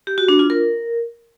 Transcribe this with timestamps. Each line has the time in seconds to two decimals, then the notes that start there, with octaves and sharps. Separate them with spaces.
0.07 G4
0.18 F#4
0.28 D4
0.39 F4
0.50 A#4